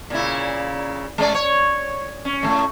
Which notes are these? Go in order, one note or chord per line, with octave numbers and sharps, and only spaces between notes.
A#2 C#3 E4
G#3 C#4 D5
C#5
C#4
A2 D#3 A3